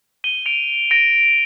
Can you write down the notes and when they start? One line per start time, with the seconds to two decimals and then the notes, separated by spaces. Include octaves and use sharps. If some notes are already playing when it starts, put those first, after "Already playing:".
0.24 D#7 G7
0.46 D7 F7
0.91 A#6 D7